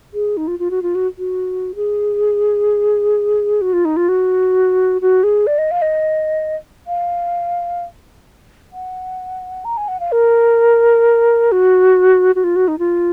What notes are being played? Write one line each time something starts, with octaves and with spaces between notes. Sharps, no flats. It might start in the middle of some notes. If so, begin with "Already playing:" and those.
G#4
D#4
F4
F4
F#4
F4
F#4
F#4
G#4
F#4
F4
D#4
F4
F#4
F#4
G#4
D5
D#5
F5
D#5
F5
F#5
A#5
G#5
F#5
F5
A#4
F#4
F#4
F4
F#4
D#4
F4